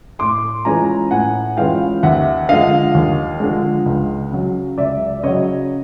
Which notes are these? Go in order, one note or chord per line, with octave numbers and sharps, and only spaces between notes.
A2 C6 D6
E3 G#3 C#4 F4 G#5 A#5
A2 F#5 G#5
E3 G#3 C#4 F4 F5 G5
D#2 E5 F#5
D3 F3 G#3 D#5 F5
D#2
D3 F3 G#3
C#2
C#3 F#3
C#2 D5 E5
D5
C#3 F#3 C#5 D#5